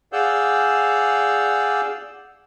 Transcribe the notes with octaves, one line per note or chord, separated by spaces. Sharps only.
G#4 D5 F5 F#5 E6 G6